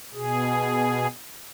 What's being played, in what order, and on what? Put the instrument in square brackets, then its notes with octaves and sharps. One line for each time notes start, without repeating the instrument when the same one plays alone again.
[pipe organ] B2 G#4